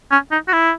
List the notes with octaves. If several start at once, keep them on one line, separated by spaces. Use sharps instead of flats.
C#4
D#4
F#4
E4